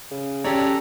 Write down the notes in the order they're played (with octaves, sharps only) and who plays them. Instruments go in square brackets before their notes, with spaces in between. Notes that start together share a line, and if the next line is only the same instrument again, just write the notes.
[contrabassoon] C#3
[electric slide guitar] C#4 G4 [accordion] A4 A#5 [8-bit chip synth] C#5 D5